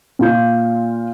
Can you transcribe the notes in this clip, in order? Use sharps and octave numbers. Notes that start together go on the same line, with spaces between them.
A#2 F4 G6